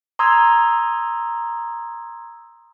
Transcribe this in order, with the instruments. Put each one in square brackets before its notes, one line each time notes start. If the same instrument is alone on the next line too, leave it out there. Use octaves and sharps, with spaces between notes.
[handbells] A#5 C6 D#6 E6 G#6